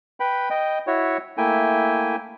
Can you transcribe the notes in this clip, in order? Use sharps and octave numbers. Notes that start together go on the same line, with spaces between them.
B4 G5 B5
D#5 G5
E4 F#4 C#5
A3 A#3 E4 G5 G#5